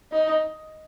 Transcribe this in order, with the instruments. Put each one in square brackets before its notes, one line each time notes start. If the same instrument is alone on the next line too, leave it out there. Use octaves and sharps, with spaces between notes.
[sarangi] D#4